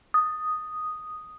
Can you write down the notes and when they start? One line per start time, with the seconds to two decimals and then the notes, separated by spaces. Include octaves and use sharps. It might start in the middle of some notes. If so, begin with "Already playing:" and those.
0.14 D#6